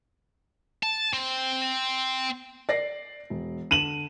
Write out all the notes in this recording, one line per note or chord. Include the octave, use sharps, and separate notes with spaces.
A5
C4
D5 A#6 C7
E1
D3 D#7 E7 F#7